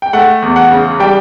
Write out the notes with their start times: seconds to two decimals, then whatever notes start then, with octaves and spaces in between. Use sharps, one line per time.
0.02 G5
0.13 A3 F#5
0.42 E2
0.56 F#5
0.71 C#3
1.00 G3 G5